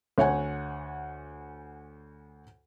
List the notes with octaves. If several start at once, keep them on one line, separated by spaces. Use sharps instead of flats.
D2 C#5 F#5 G#5